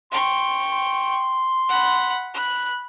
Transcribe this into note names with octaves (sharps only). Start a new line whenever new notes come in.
G5 C6 C#6
C6
F#5 B5
B5 F#6